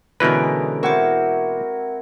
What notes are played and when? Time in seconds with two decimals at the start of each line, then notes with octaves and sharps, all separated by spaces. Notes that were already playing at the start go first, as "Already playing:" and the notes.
0.20 B2 D3 E3 G#3 C#4 A#4 B4
0.83 C4 E4 F#4 A#4 F#5 C#6 D6